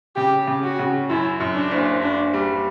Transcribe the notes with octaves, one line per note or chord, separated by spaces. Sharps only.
C#3 G4
C#3
F#4
C#3
F#2 E4
F#2
D4
F#1
F#1 D4
G3